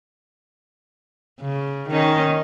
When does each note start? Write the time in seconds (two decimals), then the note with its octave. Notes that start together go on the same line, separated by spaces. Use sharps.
1.41 C#3
1.90 D#3 C#4 D#4